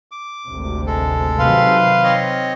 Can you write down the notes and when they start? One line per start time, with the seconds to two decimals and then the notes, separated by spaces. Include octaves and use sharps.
0.11 D6
0.47 G#1 D2 C3
0.87 G#3 A4
1.39 C3 D#3 F#3 B4 F5 C6
2.04 C4 C#5 D#5